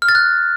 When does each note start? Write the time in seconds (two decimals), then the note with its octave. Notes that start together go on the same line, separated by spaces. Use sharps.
0.02 F6
0.09 A6
0.15 F#6